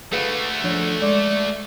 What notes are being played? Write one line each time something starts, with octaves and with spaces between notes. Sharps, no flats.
A3 F#4 G#4 B4 F5
F3 D4 C#5
G#3 D5